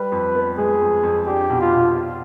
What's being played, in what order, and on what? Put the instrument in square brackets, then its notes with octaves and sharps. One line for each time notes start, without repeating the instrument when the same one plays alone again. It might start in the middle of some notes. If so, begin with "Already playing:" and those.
Already playing: [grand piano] G3 [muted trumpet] B4
[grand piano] F2
B3
[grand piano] G#3 [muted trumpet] G#4
[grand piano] F2
F2
[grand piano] D4 [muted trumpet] G4
[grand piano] B2
[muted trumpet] F4
[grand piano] B2
F4